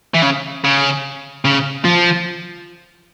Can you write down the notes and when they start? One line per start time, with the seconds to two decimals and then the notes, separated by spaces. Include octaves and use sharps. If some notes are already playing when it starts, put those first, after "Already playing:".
0.14 E3
0.23 C#3
0.64 C#3
1.45 C#3
1.85 F3